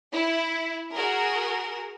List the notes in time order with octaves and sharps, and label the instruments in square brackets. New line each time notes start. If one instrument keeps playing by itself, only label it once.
[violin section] E4
F#4 G#4 A#4